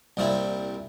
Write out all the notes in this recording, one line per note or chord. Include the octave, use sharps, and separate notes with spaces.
C2 A#2 G3 C4 E4